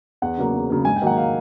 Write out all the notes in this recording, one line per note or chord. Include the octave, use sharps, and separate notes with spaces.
E2 F#5
C#3 F#3 A#3
E2
C#3 F#3 A#3
G#2 G#5
G5
D#3 F#3 A#3 F#5
F5